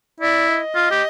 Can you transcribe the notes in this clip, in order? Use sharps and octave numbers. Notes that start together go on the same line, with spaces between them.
E4 D5
D#5
F4
G4